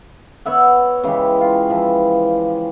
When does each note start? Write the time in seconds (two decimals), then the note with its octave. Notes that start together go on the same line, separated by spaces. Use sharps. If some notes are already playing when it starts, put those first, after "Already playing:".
0.46 B3 C#5 E5 F#5
1.04 C#3 E3 G#3 G4
1.41 F4
1.70 E3 F3